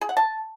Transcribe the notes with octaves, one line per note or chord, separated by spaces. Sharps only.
G#4
F#5
A5